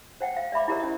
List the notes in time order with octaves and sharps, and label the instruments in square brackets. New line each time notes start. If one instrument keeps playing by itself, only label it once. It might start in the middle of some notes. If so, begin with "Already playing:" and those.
[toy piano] C5 F#5 G5
F5
D5 E5 B5 D6
E4 G4 A#4 C5 D5
C#4 D#5